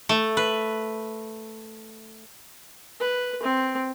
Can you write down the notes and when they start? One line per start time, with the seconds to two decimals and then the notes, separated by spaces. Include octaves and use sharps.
0.09 A3
0.37 B4
3.01 B4
3.43 C4